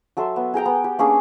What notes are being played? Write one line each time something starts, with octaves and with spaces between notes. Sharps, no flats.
F#3 A4 E5 C6
B3
G#4 A#4 G5 A#5
B3
G4
A#3 C#4 D4 G#4